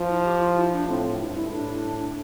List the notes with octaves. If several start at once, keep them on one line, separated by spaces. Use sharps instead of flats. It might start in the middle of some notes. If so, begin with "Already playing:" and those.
Already playing: F3
E4
G4
F4
E4
D4
A2 C4
G2 E4
D4
E4
A2 D4